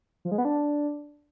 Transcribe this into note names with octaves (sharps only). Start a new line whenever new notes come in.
F3
G#3
B3
D4